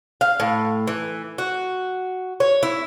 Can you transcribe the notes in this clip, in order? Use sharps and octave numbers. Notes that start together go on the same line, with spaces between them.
F5
A2
E3
F#4
C#5
E4